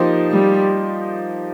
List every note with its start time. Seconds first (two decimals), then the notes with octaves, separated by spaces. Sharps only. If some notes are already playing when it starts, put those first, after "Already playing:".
Already playing: F3 A#3 D#4 G4 C5
0.31 G3